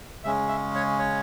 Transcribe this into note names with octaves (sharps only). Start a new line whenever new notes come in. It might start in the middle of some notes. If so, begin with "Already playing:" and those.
C#3 G#3 C#4 E5
E5
C#5
C#5